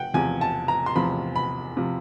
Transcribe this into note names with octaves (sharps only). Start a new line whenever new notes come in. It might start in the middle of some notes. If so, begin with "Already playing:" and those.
Already playing: F#5 G5
E2 C3 F3 G#5
A5
A#5
C6
E2 C3 F3 B5
B5
C3 F3